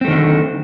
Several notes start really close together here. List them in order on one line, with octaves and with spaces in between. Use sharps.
C4 A3 D#3 D3